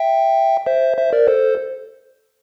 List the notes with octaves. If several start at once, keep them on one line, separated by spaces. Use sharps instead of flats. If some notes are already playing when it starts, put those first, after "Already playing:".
Already playing: E5 G5
C5 E5
C5 E5
A#4 D5
A4 C5